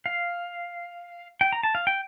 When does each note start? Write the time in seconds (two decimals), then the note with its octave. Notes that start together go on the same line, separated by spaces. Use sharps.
0.06 F5
1.41 G5
1.52 A#5
1.63 A5
1.75 F5
1.87 G5